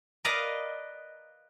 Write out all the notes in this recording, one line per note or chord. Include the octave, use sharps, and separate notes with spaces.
A#4 B4 D5 D#5 F5 A#5